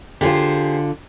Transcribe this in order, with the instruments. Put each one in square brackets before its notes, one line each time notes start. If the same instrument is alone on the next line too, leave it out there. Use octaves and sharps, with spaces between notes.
[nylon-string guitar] D3 F4 [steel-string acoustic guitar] G4 G#4 C5